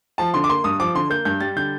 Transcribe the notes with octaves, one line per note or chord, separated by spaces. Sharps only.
F3 A5
D3 C6
D6
A#3 C6
G2 D#6
F3 D6
D3 C6
A#3 G6
G2 G6
G3 A6
D3 G6